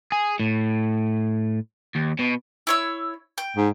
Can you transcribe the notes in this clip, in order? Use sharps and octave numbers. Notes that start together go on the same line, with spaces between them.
G#4
A2
D#2
B2
E4 C#5 E6
G5
G#2